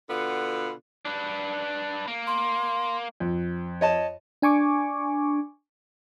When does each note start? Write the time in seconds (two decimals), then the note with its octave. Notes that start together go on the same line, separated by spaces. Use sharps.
0.09 B2 D3 B3 F4
1.05 D4 B4
2.08 A#3
2.27 C6
3.20 F2
3.81 C#5 D#5 A5
4.42 D4 G#5 C#6 D6